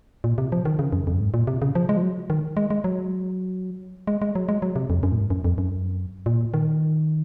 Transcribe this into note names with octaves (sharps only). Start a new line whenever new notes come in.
A#2
C3
F3
D#3
C#3
F#2
F2
F#2
G#2
A#2
C3
C#3
F3
G#3
F3
F#3
D#3
G#3
G#3
F#3
G#3
G#3
F#3
G#3
F#3
C3
F2
F#2
A#2
G#2
F#2
F2
F#2
A#2
D#3